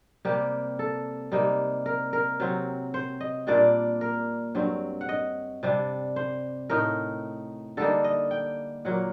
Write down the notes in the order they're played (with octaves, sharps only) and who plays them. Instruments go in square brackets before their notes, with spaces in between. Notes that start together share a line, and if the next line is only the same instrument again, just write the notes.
[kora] C3 G3 A#3 G4
A4
C3 G3 A#3 D#4
A#4
A#4
C3 F#3 C4
C5
D#5
A#2 G3 A#3 D4 D5
A#4
G2 F#3 C4
F#5
D#5
C3 G3 D4
C5
A2 A3 D#4 A#4
D3 G3 A#3 D#4 A4
D#5
G5
A#2 F#3 A#3 F#5